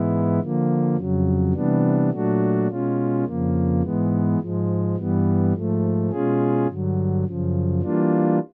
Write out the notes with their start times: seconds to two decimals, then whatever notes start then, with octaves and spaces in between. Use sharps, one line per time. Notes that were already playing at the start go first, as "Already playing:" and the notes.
Already playing: G#2 E3 G#3 B3 E4
0.40 D3 F3 A#3
0.96 F2 C#3 F#3
1.53 C3 E3 G3 B3 D4
2.11 A#2 F#3 A3 D4 F#4
2.67 B2 G#3 C#4 F4
3.25 F2 C#3 F3 A#3
3.82 G#2 E3 G#3 B3
4.40 G#2 F3 G#3
4.96 G2 E3 G3 B3
5.53 G#2 F3 A3
6.10 B2 G#3 C#4 F4 G#4
6.67 G2 D3 F#3
7.25 F#2 C#3 F3
7.82 E3 G3 A#3 D4 F4